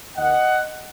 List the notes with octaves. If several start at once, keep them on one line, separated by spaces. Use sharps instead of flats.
D#2 D#3 A#3 D#5 F#5